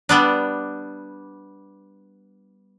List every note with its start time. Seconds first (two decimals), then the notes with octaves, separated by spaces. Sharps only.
0.09 G3 B3 D4